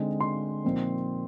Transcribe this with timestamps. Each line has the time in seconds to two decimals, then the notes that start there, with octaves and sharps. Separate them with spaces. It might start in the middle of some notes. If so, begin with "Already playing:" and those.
Already playing: D3 G#3 C4 D#4
0.20 C6
0.65 A#2 F3 C4 D#4